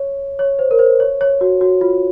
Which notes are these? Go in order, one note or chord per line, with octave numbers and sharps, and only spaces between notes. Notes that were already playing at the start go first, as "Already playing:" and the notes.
Already playing: C#5
C#5
C5
A#4
C5
C#5
C#5
F#4
F#4
F4